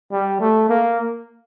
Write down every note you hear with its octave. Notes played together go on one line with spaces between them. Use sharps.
G3
A3
A#3